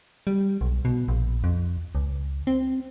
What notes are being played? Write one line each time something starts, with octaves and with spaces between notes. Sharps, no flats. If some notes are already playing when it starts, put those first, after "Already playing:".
G3
B1
B2
A#1
F2
C#2
C4